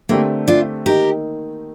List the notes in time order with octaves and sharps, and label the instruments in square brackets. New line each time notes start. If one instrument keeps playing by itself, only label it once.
[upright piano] D3 A3 C4 G4 A#4 [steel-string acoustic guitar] A#3
[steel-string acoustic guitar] D4 F4
[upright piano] D#3 A#3 D#4 [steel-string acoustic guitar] G4 A#4